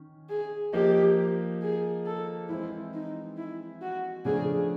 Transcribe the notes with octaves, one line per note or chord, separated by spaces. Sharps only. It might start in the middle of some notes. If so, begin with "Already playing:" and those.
Already playing: D#3 C#4
G#4
F3 A#3 D#4 G4
G#4
A4
E3 G#3 C4 E4
D#4
E4
F#4
C#3 F3 A3 D4 G#4